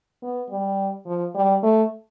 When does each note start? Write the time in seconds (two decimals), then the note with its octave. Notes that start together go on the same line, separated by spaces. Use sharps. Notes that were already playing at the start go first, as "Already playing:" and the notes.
0.23 B3
0.50 G3
1.07 F3
1.35 G3
1.63 A3